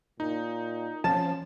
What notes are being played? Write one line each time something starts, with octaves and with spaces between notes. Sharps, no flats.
A#2 D#4
F3 C#4 A5